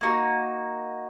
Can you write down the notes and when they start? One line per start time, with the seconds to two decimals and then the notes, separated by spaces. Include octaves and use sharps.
0.01 A#3 D#4 F#4